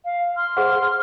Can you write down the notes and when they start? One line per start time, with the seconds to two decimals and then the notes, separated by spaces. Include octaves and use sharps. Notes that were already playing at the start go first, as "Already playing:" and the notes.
0.06 F5
0.36 C6 F6
0.57 G#4 C5 F#5